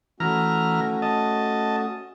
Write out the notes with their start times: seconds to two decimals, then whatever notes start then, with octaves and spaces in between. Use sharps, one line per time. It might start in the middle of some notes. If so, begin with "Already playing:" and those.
0.20 E3 A3 C#4 F#4 A#5 F6
1.02 D#5 A5